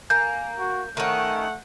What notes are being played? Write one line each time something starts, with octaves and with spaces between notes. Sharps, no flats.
A#3 G#5 G6
F#4
D#3 A3 C#4 F#5